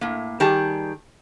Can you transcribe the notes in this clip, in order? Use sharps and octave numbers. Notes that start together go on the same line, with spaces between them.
A2 A#3
D#3 G3 G4 G#4 A5